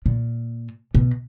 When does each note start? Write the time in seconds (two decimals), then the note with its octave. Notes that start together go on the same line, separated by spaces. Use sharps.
0.06 A#2
0.95 B2